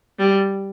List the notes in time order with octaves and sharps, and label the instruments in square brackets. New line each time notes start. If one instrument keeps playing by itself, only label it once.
[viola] G3